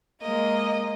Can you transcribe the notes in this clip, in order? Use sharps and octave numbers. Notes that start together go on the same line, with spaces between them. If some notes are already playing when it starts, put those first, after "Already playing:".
G#3 A#3 D#5